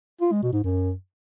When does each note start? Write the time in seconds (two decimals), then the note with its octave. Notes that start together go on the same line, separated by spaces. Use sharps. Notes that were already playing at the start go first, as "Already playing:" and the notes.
0.21 F4
0.32 G#3
0.43 B2
0.53 G#2
0.64 F#2